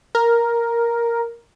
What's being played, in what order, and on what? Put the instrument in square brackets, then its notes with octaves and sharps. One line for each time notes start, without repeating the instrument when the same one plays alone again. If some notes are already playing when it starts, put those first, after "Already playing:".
[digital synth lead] A#4